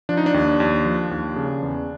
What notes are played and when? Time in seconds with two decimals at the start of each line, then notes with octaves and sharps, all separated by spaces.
0.09 F3 D4
0.17 D#4
0.26 D4
0.34 D#2
0.60 D#2
0.85 F3
1.11 D#2
1.36 C#3
1.62 E2